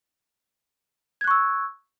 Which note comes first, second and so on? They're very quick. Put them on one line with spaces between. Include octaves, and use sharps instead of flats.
G#6 F#6 C#6 E6